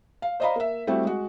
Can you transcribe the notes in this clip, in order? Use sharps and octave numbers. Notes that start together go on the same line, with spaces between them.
F5
C5 D5 D#5 F5 A#5 B5
A#3 E5
G3 A3 C4 E4 F#4
G#3 F#4